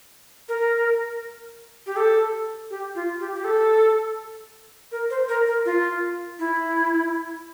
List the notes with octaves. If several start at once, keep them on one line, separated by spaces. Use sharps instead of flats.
A#4
G4
A4
G4
F4
G4
G4
A4
A#4
C5
A#4
A#4
F4
E4